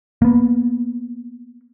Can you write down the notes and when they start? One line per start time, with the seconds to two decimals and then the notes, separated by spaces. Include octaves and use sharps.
0.22 A#3 B3